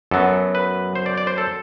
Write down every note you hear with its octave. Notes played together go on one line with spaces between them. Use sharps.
F#2 F#3 B3 A4
B4
C5
D5
D5
C5
A4